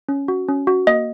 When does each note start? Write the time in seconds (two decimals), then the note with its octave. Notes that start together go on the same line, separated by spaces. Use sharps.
0.09 C#4
0.28 F#4
0.48 C#4
0.67 F#4
0.87 A#3 D#5